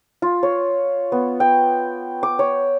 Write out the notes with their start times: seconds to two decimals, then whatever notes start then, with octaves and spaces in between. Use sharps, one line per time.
0.22 F4
0.43 C#5
1.12 B3
1.40 G5
2.23 D6
2.39 C#5